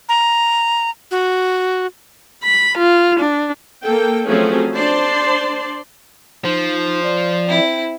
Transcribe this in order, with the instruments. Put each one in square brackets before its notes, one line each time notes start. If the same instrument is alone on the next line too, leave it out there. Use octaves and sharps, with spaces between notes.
[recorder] A#5
F#4
[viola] B5
F4
D4
[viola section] A#3 A4 G5
F3 F#3 A3 C4 C#4 G#4
D4 C5 D5 A5 C6
[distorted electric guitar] F3 [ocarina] D#4 [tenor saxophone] C5
[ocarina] D5
[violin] C4 E4